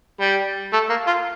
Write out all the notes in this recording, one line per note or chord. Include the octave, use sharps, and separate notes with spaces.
G3
A3
A#3
F4